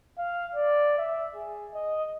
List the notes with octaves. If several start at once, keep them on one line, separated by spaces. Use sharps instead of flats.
F5
D5
E5
G#4
D#5